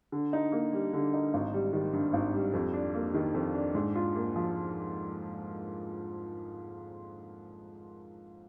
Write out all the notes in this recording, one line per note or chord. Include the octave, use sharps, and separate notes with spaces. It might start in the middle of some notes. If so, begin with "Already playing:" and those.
D3
D#4
A#3
G3
D3
D#4
G#1
G3
D#3
G2
G#1
G3
F2
D4
A#3
D#3
F2
D4
G#2
F4
A#3
F3